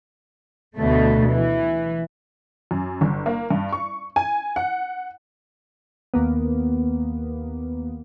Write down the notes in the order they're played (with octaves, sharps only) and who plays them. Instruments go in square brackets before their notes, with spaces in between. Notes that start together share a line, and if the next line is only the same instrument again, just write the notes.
[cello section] D2 B2 A3
E3
[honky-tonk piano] F#2
G1
A#3
G2
C#6
G#5
F#5
[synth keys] D#2 A#3 B3